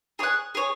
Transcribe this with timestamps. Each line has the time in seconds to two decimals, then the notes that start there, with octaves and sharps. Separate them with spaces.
0.19 G#4 C#5 F#5
0.55 G#4 C#5